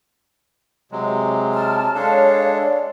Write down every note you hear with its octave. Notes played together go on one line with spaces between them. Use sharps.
C3 F#3 G#3
A5 F6
G#3 D4 A4 C#5 F5
D5